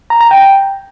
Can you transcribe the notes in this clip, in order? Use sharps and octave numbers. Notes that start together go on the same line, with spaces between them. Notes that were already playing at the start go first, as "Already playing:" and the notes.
A#5
A#5
G5